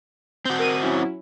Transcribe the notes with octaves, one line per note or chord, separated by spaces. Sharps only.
C4 F#4 G6
A#4 D#7
F#3 C#4 E4